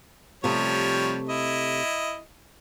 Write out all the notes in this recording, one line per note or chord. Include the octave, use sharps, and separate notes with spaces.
C3 F3 G3 A3 C#5
E4 D#5